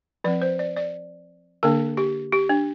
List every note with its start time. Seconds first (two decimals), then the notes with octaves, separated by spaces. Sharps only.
0.24 F3 C4 D5
0.42 C5
0.59 D5
0.76 D5
1.63 D3 A#3 D4 A#4
1.97 G4
2.32 G4
2.49 D4